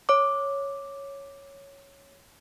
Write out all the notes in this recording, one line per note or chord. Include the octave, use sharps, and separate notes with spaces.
C#5 D6